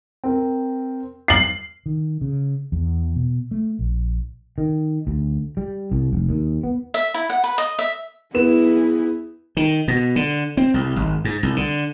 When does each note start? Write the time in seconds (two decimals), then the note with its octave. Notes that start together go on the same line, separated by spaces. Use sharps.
0.24 C4 A#4
1.28 F6 C7 F#7
1.86 D#3
2.21 C#3
2.72 E2
3.16 B2
3.51 A3
3.79 A#1
4.58 D#3
5.07 D2
5.57 G3
5.92 C2
6.13 F1
6.29 D#2
6.63 B3
6.94 E5
7.14 E4
7.30 F#5
7.44 B4
7.58 D#5
7.79 E5
8.34 B3 E4 G#4 E7
9.57 D#3
9.88 B2
10.16 D3
10.57 C4
10.74 C2
10.96 G#1
11.25 G#2
11.43 C2
11.56 D3